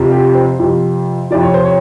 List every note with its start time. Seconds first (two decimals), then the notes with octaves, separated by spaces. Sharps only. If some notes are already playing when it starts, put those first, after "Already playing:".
Already playing: F2 C3 F3
0.12 G4
0.35 C5
0.59 F2 C3 F3
1.31 F2 C3 F3 D5
1.43 C#5
1.54 C5
1.65 C#5